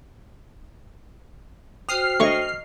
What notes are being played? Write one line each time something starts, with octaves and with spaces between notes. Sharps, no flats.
F#4 C5 G5 D#6 F6 C7
D2 A3 C#5 D#5 C#6